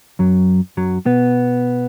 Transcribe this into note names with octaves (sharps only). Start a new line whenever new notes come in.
F#2 F#3
F#2 F#3
B2 B3